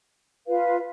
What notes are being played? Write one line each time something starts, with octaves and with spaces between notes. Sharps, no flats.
F4 B4 F5